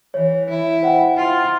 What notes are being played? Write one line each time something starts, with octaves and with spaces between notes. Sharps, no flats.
E3 C#5
E4
C5 F#5 G5
F4